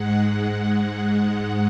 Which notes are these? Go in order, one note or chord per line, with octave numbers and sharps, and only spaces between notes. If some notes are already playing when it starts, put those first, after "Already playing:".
Already playing: G#2 G#3 F#5
F#5